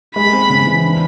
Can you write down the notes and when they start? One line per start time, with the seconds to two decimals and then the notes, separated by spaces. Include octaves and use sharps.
0.16 G#3 B5
0.33 C4
0.50 C#3
0.66 E3
0.84 D4